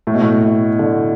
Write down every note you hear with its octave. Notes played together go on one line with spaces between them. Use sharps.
A2
B2
A2
B2
D3